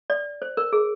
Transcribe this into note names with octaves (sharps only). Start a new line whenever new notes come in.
D5
C5
A#4
G#4